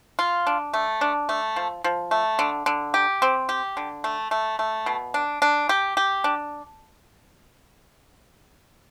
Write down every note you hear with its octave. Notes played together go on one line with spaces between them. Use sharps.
F4
D4
A3
D4
A3
F3
F3
A3
D3
D3
G4
C4
G4
D3
A3
A3
A3
B2
D4
D4
G4
G4
D4